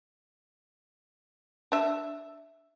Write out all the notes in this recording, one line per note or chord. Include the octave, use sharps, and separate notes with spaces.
D4 E5